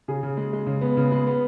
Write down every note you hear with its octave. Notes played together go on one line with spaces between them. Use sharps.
C#3 G#4
C#3
G#3
G#3
C#3
B3
C#3
G#3
B3